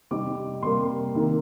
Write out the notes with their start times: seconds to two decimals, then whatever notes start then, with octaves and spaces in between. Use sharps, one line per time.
0.11 C3 G3 C4 D#4 D6
0.63 C3 G3 A#3 C6
1.15 C3 D#3 A#3